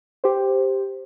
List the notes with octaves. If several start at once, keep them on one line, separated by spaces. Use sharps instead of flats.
G4 C5